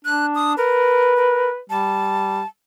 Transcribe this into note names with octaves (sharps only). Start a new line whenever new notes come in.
D4 F#6
D#6
A#4 B4
A#4
G3 A5